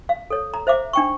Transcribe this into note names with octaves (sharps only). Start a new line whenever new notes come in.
F5
A4 C#5
A#5
C5 E5 F5 D6
D4 G5 C#6